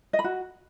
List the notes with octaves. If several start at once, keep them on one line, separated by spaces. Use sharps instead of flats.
D#5
B5
F#4